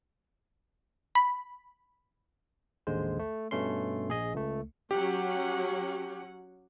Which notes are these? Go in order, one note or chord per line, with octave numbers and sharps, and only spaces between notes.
B5
A1 D#2 D3 G#3 C5
A3
G2 B2 A3 C#4 C6
A#1 G#4 D#5
C#2 A3
F#3 C#4 G4 F#5